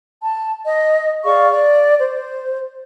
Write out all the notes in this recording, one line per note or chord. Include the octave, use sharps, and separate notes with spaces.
A5
D#5
G#4 D5 F5 C#6
D5
C5